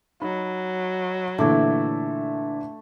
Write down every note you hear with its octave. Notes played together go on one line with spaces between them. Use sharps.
F#3 D#4 B5
A#2 D3 E3 A3 D4 A4 D6 G#6